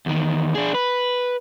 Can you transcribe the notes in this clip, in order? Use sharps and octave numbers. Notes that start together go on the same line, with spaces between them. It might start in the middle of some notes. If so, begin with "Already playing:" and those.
E2 D#3
D4 G#4
B4